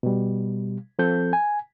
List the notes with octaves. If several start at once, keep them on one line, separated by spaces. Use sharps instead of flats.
B2 G3
F3 C4 A4 G6
G#5